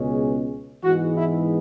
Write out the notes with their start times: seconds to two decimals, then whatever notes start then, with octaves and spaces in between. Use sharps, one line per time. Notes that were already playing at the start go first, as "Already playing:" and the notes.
Already playing: C#2 B2 G#3 C#4
0.84 G#2 E3 G#3 B3 F#4
1.16 E4